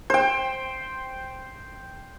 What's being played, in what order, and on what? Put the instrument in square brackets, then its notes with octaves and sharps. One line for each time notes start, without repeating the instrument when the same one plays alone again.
[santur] C5 G5